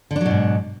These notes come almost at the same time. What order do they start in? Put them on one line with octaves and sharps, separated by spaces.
D3 D4 F#3 B2 G#2